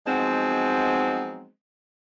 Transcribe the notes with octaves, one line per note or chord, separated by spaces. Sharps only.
F3 F#3 G#3 B3 C4 D#4